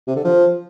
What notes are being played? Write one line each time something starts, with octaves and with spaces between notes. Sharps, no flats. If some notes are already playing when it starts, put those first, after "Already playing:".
C3
D3
F3